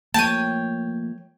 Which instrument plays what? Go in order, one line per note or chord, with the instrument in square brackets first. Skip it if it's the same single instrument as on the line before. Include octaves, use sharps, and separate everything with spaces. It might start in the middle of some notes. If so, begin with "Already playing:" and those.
[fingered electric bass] F3 A3 A#3 [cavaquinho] C#5 G5 [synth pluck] A5 D#7